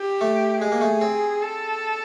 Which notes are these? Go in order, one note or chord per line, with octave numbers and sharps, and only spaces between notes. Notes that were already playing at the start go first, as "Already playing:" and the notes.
Already playing: G4
A3
G#3 G#4
A#3
A3
C4
A4